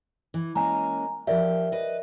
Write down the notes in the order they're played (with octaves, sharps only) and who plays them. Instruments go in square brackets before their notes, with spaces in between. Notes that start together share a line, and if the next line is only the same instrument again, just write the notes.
[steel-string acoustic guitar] E3
[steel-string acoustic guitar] G#3 A#3 C#4 [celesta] G#5 A#5
[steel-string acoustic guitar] F3 G4 [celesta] A#4 D5 E5
[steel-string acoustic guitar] B4 D#5